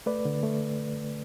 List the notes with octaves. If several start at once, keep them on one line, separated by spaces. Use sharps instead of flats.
A3 B4 D5
D3
A3